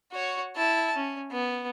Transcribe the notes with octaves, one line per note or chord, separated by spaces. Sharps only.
F#4 C#5
E4 A5
C#4
B3